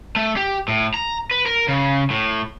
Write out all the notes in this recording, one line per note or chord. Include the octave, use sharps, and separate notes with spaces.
A3
G4
A2
A#5
B4
A#4
C#3
A2